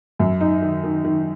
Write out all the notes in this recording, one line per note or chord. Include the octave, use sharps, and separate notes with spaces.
F#2
D#4
D#3
D#3
D#3